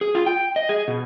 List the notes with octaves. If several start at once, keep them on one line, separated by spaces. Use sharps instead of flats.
G#4
F4
G5
D#5
G#4
B2